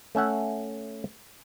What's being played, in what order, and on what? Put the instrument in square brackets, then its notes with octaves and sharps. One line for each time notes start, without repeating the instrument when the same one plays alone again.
[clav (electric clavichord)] A3 C#4 E5 F#5